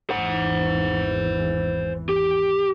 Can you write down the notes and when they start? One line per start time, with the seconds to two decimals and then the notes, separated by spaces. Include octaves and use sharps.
0.10 G#1 E2 E3 C5 F#5
2.09 G4